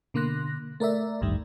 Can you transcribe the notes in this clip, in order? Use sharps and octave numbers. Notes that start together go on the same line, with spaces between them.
B2 D3 A#3 C6 F#6 A#6
A3 A#4 D5 E5
A1 D2 G2 D#3 G3